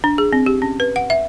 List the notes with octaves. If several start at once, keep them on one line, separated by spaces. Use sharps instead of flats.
D4
G#4
C4
G4
C#4
B4
F#5
E5